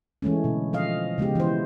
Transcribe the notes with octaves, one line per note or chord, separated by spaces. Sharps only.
E3 G#3 A3 C#4
B2 D3
F3 D#5 F5
C#3 G#3 B3 G4
E3 C5